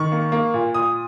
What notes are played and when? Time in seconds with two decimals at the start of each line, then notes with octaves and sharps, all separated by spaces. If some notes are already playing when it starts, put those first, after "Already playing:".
Already playing: D#3 C#6
0.12 A#3
0.32 A#3
0.54 A#2
0.74 A#2 D#6